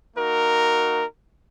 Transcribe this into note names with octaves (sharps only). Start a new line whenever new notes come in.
A#3 D#4 F#4 A#4